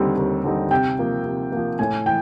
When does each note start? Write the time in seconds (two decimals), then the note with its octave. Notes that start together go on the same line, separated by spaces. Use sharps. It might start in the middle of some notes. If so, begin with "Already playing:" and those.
Already playing: D#2 D3 G3 C4 D#4
0.17 D#2
0.44 D3 G3 C4 D#4
0.71 C3 G5
0.98 F3 A#3
1.26 C3
1.52 F3 A#3
1.79 A2 G#5
2.06 E3 G5